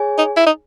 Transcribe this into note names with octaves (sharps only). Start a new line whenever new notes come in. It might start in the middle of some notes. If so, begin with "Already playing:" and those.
Already playing: G#4 C#5 G#5
D#4
E4
D#4